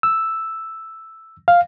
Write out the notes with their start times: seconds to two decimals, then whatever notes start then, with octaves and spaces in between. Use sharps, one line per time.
0.03 E6
1.48 F5